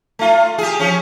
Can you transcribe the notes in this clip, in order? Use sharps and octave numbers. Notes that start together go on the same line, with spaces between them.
A3 F4
G4 G#4
F3 C#4